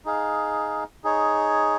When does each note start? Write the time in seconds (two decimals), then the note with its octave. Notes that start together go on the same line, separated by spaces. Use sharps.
0.05 D#4 G#4 F5
1.04 D#4 G#4 C#5